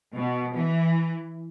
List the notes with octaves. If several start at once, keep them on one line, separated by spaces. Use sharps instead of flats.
B2
E3